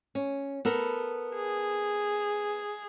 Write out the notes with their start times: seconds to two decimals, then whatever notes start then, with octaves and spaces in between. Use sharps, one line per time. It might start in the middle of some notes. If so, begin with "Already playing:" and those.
0.15 C#4
0.65 B3 A4 A#4
1.35 G#4